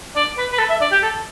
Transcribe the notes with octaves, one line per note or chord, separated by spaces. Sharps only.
D5
B4
B4
A4
E5
D5
G4
A4